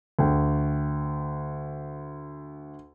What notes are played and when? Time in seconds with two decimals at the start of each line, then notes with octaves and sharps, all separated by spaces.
0.19 D2 G5